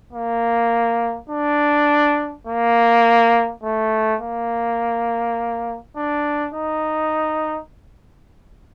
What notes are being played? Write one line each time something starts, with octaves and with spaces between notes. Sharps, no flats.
A#3
D4
A#3
A3
A#3
D4
D#4